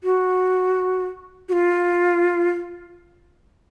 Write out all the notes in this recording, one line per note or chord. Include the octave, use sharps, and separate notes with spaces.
F#4
F#4
F4